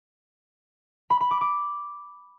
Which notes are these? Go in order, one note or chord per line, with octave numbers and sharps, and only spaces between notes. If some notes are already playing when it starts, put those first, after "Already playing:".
B5
B5
D6
D6